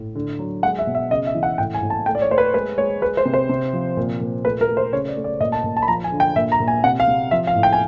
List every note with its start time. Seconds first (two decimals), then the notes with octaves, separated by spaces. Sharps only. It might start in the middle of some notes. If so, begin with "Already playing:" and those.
Already playing: A2
0.15 D3
0.39 F#3
0.63 G#3 F#5
0.79 E5
0.87 B2
0.95 E5
1.11 C#3 D#5
1.27 E5
1.34 E3
1.43 F#5
1.58 A2 G5
1.74 G#5
1.82 A2
1.90 A5
2.06 A3 G5
2.15 D5
2.22 C#5
2.30 A3 C5
2.38 B4
2.54 G#3 B4
2.78 G#3 C#5
3.02 G#3 B4
3.17 C5
3.25 C3
3.34 C5
3.49 C3
3.73 F3
3.97 A#2
4.21 A#2
4.45 A3 B4
4.61 A#4
4.69 A3
4.77 C5
4.93 C#3 C#5
5.08 D5
5.16 A3
5.24 D5
5.40 A#2 D#5
5.52 A5
5.64 A#2
5.77 A5
5.82 B5
5.88 F3 A#5
6.04 G#5
6.12 D3
6.20 G5
6.36 A#2 E5
6.52 A#5
6.60 A#2
6.68 G#5
6.84 C3 F#5
7.00 F5
7.08 C3
7.31 F3 E5
7.47 F5
7.55 A2
7.63 G5
7.73 G#5